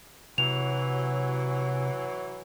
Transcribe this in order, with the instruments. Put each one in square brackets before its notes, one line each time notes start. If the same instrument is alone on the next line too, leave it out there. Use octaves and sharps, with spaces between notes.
[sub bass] C3 [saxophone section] E3 F#3 [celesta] F7